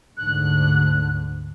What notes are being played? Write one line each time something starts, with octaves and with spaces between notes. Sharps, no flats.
D2 G#2 D3 F#6